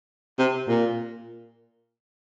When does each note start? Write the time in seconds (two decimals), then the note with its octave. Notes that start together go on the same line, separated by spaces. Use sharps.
0.39 C3
0.68 A#2